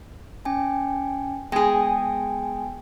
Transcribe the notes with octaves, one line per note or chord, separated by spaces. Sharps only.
C#4 G5 G#5
G#3 B3 G#4 G5 G#5